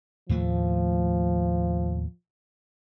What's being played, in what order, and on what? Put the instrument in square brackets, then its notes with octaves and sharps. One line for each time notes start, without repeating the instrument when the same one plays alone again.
[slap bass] D#2 A2 A3 [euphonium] F3